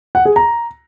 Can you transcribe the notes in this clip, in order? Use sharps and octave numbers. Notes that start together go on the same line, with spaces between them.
F#5
G#4
A#5